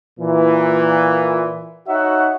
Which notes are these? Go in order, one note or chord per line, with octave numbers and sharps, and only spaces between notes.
A#2 E3
D#4 F#4 C#5 E5 F#5